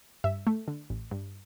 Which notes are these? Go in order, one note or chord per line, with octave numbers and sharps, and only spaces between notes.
G2 E5
A3
D3
A1
G2